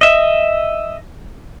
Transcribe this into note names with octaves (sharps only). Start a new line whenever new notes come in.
D#5 E5